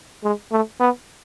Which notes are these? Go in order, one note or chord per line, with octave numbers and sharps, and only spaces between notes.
G#3
A3
B3